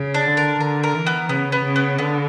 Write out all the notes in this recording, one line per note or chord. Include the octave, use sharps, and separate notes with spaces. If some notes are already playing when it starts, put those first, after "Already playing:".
Already playing: C#3
D4
D3
A#4
D3 A#4
A#4
E3
B3
C#3 B3
B3
C#3
B3
D3 B3